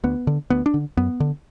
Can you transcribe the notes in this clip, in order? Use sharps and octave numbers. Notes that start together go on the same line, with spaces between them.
D2 B3
D3
D2 B3
D4
D3
F#2 B3
D3